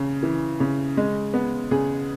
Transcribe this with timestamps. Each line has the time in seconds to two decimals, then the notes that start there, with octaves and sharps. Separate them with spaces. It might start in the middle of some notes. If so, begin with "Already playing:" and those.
Already playing: C#3
0.23 E3
0.60 C#3
0.97 G#3
1.34 B3
1.71 C#3 G#4